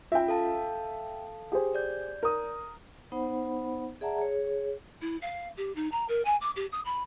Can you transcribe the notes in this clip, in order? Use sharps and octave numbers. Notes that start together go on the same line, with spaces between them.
C#4 F4 E5 G5
A4 F5 A5
G4 G#4 C5
D5 G6
A#4 D#6
B3 D#4 C5 F#5 B5
G#4 D5 E5 F#5 A5 A#5
G#4 C#5
E4
F5
G4
D#4
A#5
A#4
G#5
D6
G4
D#6
B5